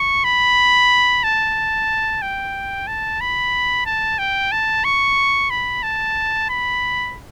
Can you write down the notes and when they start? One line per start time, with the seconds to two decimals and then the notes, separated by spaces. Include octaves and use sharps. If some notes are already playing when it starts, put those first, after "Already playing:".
Already playing: C#6
0.24 B5
1.24 A5
2.22 G5
2.87 A5
3.21 B5
3.86 A5
4.19 G5
4.52 A5
4.84 C#6
5.50 B5
5.83 A5
6.50 B5